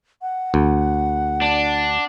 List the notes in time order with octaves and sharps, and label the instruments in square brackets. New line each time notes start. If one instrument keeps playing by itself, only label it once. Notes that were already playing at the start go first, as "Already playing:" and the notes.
[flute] F#5
[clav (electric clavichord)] D2
[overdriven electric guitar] D4